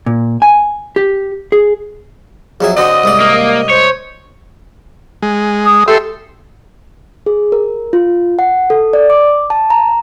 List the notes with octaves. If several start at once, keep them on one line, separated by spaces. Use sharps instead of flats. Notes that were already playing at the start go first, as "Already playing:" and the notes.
A#2
G#5
G4
G#4
F2 F#3 G#4 E5
D3 C4 F#4 D#5 D#6
C2 G#2 D5
A#3
C5 C#5
G#3
D#6
G4 A4 E5 C6
G#4
A#4
F4
F#5
A4
D5
D6
A5
A#5